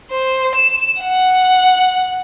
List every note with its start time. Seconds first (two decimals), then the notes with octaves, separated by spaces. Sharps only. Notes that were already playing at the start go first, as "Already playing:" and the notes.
0.11 C5
0.55 E7
1.02 F#5